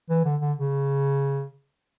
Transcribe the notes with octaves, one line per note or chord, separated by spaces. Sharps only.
E3
D3
D3
C#3